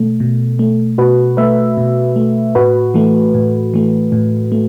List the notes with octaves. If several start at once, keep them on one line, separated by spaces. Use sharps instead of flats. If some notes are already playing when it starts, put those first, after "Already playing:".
Already playing: B2 A3
B2
A3
B2 F#4 B4
A3 B4 E5
B2
A3
A2 F#4 B4
E3 A3
A2
E3 A3
A2
A3